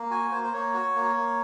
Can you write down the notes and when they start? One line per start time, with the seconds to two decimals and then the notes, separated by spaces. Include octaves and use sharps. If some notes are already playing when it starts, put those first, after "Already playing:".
Already playing: A#3
0.11 F#4 G#5
0.31 A#3 C5
0.44 C5
0.53 A#3 C#5
0.74 F#4
0.95 A#3
1.16 A#3